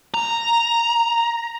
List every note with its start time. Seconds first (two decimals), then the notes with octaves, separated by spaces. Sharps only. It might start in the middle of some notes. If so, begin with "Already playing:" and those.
0.14 A#5